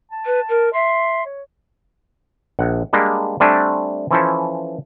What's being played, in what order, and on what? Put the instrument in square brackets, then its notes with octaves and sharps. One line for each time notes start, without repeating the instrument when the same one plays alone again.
[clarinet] A5
[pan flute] B4
A#4
[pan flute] E5 [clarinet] C6
[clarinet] C#5
[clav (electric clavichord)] A#1 F#5
G3 G#3 A#3 D4
G3 A3 C4 D4 G#5
E3 F3 C#4 E4 A4 C5